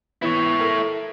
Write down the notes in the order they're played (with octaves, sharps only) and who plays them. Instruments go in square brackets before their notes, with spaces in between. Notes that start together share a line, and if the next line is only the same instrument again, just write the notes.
[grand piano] E3 B3 [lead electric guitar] E4 C#5
[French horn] A4 [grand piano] A#4